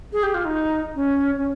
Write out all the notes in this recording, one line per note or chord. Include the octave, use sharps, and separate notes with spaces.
G#4
G4
F4
D#4
C#4
C#4